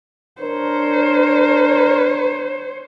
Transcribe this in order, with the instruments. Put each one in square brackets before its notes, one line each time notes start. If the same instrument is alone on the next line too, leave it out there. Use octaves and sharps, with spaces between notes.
[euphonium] D4 [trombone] A#4 [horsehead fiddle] C5 C#5